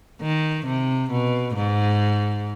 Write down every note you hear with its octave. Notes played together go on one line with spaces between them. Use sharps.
D#3
C3
B2
G#2